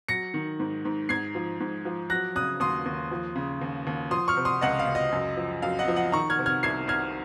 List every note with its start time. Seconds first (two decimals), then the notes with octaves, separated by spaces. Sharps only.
0.08 F#3 A#6 C#7
0.34 D#3
0.60 G#2
0.85 G#2
1.09 G#2 G#6 C7
1.35 F3
1.60 G#2
1.85 F3
2.10 F#3 F#6 A#6
2.35 C#3 D#6 F#6
2.60 D#2 C6 D#6
2.86 D#2
3.11 F3
3.36 C#3
3.61 D#2
3.87 D#2
4.11 F3 C6 D#6
4.28 C#6 F6
4.37 C3
4.45 C6 D#6
4.61 C#2 D#5 F#5
4.79 F5
4.87 C#2
4.95 D#5
5.12 F#2
5.37 F3
5.62 F#2 F5
5.79 D#5 F#5
5.88 F3
5.96 D#5 F#5
6.12 D#3 A#5 C#6
6.30 F6 G#6
6.39 C3
6.46 F6 G#6
6.63 C2 G#6 C7
6.88 C2 F6 G#6